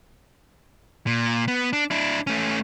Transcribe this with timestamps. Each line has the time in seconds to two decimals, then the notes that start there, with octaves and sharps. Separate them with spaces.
1.07 A#2
1.48 B3
1.73 D4
1.91 D4 E4
2.27 A3 C#4